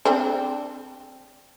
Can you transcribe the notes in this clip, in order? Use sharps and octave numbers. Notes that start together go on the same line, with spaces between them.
C4 D4